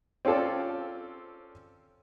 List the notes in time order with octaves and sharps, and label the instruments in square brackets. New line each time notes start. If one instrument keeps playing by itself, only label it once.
[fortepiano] C4 C#4 F4 A4 D5